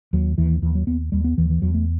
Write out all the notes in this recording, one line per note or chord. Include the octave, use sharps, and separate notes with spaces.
D#2 F#3
D#2 E3
D#2 E3
F#3
D#2 B3
D#2 G3
B3
D#2 E3
E3
E2 F#3
A3